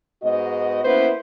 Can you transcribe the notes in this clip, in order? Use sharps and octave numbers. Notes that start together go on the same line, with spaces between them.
G#2 B3 F#4 D#5
A#3 B3 C#4 E4 B4 C5